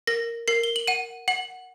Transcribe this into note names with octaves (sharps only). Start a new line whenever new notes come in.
A#4 A#6
A#4 C7
G7
F#7
F#5 D#7
F#5 F#7